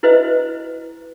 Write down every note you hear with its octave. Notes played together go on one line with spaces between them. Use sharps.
E4 F#4 B4 C5 D#5 E5